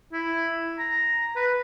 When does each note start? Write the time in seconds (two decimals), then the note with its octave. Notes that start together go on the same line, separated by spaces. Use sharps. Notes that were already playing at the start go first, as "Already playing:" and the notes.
0.13 E4
0.79 A#5
1.36 B4